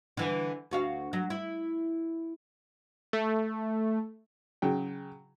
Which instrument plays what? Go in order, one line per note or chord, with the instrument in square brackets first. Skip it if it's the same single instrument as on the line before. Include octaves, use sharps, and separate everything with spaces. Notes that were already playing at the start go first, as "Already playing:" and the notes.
[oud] D3 E3
D2 F#4 F5
F#3
E4
[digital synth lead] A3
[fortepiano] C#3 F#3 G5